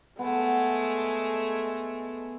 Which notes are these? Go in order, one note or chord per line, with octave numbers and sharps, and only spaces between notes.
G#3 A3 B3